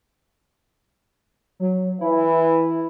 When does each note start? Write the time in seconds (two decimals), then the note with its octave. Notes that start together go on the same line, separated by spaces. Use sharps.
1.60 F#3
2.01 E3 E4